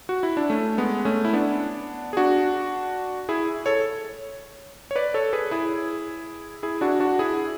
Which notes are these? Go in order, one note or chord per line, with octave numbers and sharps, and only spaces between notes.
F#4
E4
D4
A3 C#4
G#3 B3
A3 C#4
E4
B3 D4
G#4
D4 F#4
E4 G#4
A4 C#5
C#5
B4 D5
A4 C#5
G#4 B4
E4 G#4
E4 G#4
D4 F#4
D4 F#4
E4 G#4